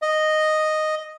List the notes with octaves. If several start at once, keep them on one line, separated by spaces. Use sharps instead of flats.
D#5